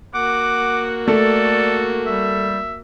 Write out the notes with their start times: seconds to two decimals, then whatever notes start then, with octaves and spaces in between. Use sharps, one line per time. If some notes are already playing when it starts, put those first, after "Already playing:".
0.14 A#3 F#4 F#5 D6
1.08 A3 A4 D5
2.06 G3 E5